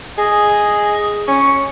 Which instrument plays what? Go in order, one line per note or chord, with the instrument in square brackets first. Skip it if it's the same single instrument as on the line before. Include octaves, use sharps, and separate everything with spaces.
[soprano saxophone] G#4 [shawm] D#5
[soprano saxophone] C#4 [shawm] C#6